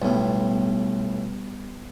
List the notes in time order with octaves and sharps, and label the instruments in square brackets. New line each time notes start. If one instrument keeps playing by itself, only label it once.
[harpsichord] B1 A2 [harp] G3 B3